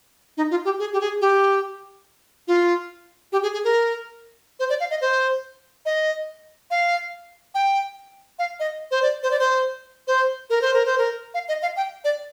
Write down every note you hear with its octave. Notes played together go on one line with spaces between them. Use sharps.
D#4
F4
G4
G#4
G4
G#4
G4
F4
G4
G#4
G#4
A#4
C5
D5
F5
D#5
C5
D#5
F5
G5
F5
D#5
C5
D5
C5
D5
C5
C5
A#4
C5
A#4
C5
A#4
F5
D#5
F5
G5
D5